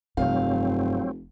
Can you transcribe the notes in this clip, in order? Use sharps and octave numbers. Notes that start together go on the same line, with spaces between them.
F1 G2 C3 F#3 C4 F5